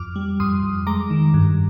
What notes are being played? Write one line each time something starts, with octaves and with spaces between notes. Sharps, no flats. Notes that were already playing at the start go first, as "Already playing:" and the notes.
Already playing: F2 D6 F6
G3
F2 C6 D#6
F2
G#3 A#5 D6
D#3
G2